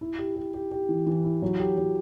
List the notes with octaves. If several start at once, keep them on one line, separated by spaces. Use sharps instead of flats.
E4
G4
G4
G4
G4
E3
E3
E4
F#3
G4
F#3